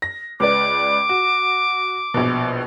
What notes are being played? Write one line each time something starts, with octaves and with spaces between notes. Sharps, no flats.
A#6
C#2 B4 D5 D6
F#4
A#1 B2